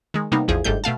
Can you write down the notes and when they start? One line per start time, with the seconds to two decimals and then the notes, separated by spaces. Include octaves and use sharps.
0.14 D#3 G#3
0.32 C3 G3 A#3 B3 D#4
0.48 A1 E2 F3 G#4
0.64 G1 G#2 G3 A3 G6
0.84 B2 A3 F5 A5